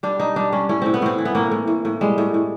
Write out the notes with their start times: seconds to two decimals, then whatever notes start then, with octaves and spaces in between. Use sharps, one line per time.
0.03 G3 D4
0.20 G3 D#4
0.36 G3 D4
0.52 G3 C#4
0.69 A2 C#4
0.82 A2 C4
0.94 B3
1.02 A2 C4
1.18 E3
1.25 B3
1.35 A2 A#3
1.51 A2
1.67 A2
1.85 A2
2.01 G3 G#3
2.18 A2
2.34 A2